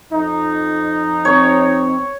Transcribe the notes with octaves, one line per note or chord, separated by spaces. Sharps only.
F2 D#4
C4 C#5